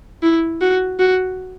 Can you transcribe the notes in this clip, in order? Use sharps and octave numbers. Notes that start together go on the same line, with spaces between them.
E4
F#4
F#4